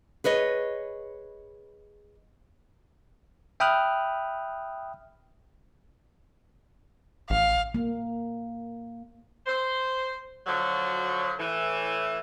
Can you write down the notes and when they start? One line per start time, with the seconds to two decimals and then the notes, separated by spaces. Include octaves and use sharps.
0.24 G#4 B4 C#5 D#5
3.60 E5 G5 B5 D#6 F6 F#6
7.30 A1 F5
7.74 A#3
9.46 C5
10.47 D3 F3 F#3
11.40 A2 E3